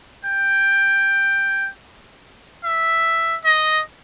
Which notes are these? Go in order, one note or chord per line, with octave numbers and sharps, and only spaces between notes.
G5
E5
D#5